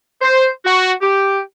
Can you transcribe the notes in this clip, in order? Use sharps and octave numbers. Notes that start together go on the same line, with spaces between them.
C5
F#4
G4